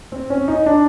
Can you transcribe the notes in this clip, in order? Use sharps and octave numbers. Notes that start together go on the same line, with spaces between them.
C4
C#4
D#4
D4